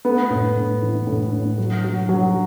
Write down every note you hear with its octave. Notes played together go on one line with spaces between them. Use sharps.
A3 B3
A2
A2
E3
A2
A2
F#3
F#3
F#3